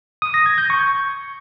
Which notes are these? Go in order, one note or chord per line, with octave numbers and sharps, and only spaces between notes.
D#6
A#6
G#6
G6
C#6